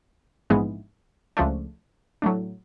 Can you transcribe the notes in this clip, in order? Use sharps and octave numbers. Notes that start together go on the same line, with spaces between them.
A#1 G#2 E3 G#3 B3
C#2 C#3 F3 A3 D4
A2 F#3 A3 D4